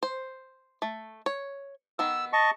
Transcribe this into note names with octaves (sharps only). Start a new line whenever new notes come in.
C5
A3
C#5
D#3 B3 F#5 E6
D#5 A5 C#6